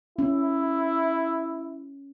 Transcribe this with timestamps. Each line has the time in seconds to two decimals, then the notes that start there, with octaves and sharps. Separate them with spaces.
0.19 C#4 E4